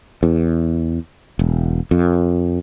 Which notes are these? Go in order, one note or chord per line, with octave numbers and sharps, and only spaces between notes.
E2
E1
F2